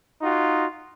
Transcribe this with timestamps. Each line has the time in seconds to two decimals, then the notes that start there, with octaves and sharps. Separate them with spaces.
0.22 D#4 F4 F#4